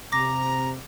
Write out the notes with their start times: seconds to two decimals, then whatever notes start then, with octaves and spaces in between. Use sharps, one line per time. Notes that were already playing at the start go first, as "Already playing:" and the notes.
0.12 C3 A#5 D6 A#6